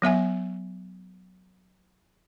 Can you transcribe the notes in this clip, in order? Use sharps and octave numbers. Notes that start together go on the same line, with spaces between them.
F#3 B3 E5 G#5